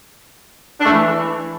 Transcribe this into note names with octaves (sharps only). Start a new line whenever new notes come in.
D4
A3
E3